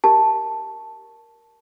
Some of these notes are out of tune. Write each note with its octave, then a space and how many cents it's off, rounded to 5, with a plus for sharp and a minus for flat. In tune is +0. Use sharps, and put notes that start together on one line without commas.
G4 +0 A#4 +5 A5 +0